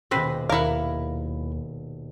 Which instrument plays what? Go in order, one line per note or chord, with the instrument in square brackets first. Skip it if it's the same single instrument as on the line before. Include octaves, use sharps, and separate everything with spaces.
[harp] D#1 B2 A#6 [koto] C4 B4 C5
[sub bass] D#2 [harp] D#3 [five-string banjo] E4 F5 [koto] A#4 F#5